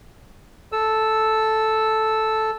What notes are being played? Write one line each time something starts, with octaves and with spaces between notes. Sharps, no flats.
A4 E6